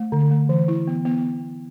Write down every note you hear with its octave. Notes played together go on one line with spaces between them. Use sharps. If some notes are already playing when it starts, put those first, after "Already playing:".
Already playing: A3
D3
A3
E3
E4
B3
B3